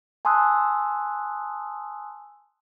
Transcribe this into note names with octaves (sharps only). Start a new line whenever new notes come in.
G#5 A5 C6 D#6 E6 F#6